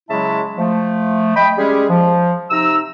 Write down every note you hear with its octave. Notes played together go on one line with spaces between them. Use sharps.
C#3 F#3 G#3 E4 E5 A5
F3 A3
D#5 G5 B5
G3 G#3 C#4 G4 G#4
F3
C3 D#4 A#5 E6